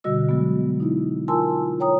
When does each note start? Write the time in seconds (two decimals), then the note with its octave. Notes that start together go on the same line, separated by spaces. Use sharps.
0.04 B2 D3 G3 F#4 D#5 E6
0.29 F#3 G#3 B3
0.80 D#4 E4
1.28 F4 A#4 G#5 A5 C6 E6
1.80 C#5 G5 A#5 D#6